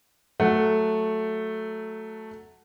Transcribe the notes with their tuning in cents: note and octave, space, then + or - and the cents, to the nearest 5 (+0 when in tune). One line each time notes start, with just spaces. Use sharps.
F#3 +0 A3 +0 F#5 +0